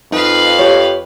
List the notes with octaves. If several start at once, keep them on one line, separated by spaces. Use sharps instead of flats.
F2 D#4 B4 F5
G4 C#5